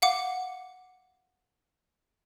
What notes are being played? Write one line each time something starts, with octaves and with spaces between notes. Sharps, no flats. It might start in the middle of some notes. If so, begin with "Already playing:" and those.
F5 F#5 D6